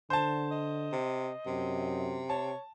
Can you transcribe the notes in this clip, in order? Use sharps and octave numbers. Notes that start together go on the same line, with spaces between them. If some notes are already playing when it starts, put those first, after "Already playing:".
D3 C5 A5
D#5
C3
F#2 C3
C#5 A5